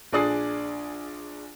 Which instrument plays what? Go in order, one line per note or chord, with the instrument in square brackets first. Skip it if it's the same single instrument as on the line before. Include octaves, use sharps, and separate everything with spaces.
[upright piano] A#1 D4 G#4 D5 D#6 C7